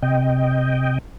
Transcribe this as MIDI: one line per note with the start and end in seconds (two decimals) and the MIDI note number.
0.02 0.98 48
0.02 0.98 75
0.02 0.98 79